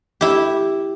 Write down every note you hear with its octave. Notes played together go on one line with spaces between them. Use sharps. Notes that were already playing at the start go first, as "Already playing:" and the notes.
E4 G4